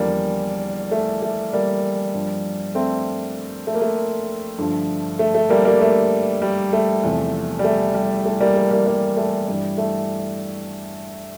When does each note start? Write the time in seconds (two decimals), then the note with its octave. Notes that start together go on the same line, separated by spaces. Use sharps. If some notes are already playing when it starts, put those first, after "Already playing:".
Already playing: E2 D3 F3 G3 A#3
0.91 A3
1.22 A3
1.53 G3 A#3
2.14 G2 F3
2.75 A3 C4
3.67 A3
3.75 A#3
3.82 A3
4.58 G2 D3 F3
5.19 A3
5.34 A3
5.50 G3 A#3
5.65 G3 A#3
5.81 A3
6.42 G3
6.73 A3
7.03 E2 C3 F3
7.59 G3
7.64 A3
7.95 G3
8.25 A3
8.40 G3 A#3
8.56 A3
8.71 G3 A#3
8.86 G3 A#3
9.17 A3
9.48 G2 E3 G3
9.78 A3